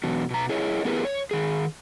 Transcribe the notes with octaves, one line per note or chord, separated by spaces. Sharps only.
E2 B2 F#3
B2 A#5
E4 G#4 C#5 D#5
B3 E4 G4 G#4 A#4 B4
C#5
D#3 G#4